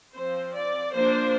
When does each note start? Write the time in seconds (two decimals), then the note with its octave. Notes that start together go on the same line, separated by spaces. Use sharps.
0.12 F3 C4 C5
0.52 D5
0.92 F3 A#3 D4 C5